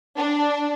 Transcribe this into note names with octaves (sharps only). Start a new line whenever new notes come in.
D4